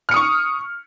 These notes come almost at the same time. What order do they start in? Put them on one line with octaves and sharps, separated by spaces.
F6 C#7 D#6 C#6